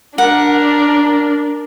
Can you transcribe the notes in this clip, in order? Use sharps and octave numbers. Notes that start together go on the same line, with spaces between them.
D4 A#4 F#5